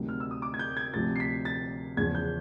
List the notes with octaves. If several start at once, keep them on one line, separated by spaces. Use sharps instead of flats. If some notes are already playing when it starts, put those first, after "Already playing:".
Already playing: D2 C3 D#3 F#3
F6
E6
D#6
D6
G#6
G6
G#6
D2 C3 F3 A6
C7
B6
A6
E2 C#3 F3 G#6
G6